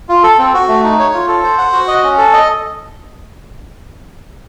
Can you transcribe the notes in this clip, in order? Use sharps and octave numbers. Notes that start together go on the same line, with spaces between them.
F4
A4
C4
F#4
A3
D#4
C#5
F4
A4
C5
F#5
F#4
D#5
C#4
A4
D#5